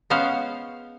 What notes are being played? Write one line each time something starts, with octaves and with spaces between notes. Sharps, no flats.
G#3 B3 C#4 C5 F5